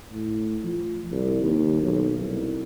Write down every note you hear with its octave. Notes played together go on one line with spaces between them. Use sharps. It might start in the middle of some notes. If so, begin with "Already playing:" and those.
A2
F3
C2
D#2
B1
C2